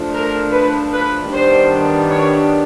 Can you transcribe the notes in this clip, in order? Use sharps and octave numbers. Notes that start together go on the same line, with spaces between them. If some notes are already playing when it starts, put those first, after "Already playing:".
Already playing: F3 A3 D4
A#4
B4
B4
D#3 G3 B3 D4 C5
C#5